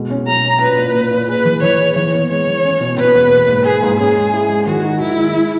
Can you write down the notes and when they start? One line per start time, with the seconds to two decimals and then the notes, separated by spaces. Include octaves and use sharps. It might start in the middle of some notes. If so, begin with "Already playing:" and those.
Already playing: B2 G#3
0.10 C#4
0.27 F#3 A#5
0.45 C#4
0.61 A#2 B4
0.77 A#2
0.95 A#2
1.11 A#2
1.28 G#4 B4
1.45 E3
1.63 E3 C#5
1.80 G#4
1.96 E3 C#5
2.13 B3
2.30 G#3 C#5
2.48 E3
2.64 C#4
2.80 B2
2.97 B2 B4
3.15 E2
3.31 A#3
3.48 G#2
3.65 A#3 G#4
3.83 G#2
3.99 C#4 G#4
4.16 G#3
4.33 E4
4.50 G#3
4.66 D#3 F#4
4.84 D#4
5.01 D#3 E4
5.17 G#3
5.35 G#3